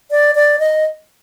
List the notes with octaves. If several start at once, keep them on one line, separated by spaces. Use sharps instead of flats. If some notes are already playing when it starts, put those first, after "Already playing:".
D5
D5
D#5